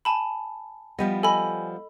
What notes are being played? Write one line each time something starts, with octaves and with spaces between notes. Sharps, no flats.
G#5 A5 B5
F3 G3 B3 D#5
A4 D#5 G#5 B5